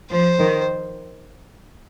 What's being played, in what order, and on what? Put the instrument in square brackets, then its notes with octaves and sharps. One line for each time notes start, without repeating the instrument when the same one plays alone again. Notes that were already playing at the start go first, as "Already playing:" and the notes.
[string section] F3 [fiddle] C5
[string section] D#3